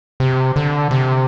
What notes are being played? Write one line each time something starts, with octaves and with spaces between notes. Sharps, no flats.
C3
D3
C3